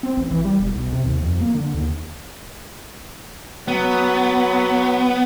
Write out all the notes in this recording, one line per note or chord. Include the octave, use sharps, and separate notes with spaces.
C4
A1
E3
G3
E1
B1
C3
D#2
F2
A#3
D3
D#2
F#3 B3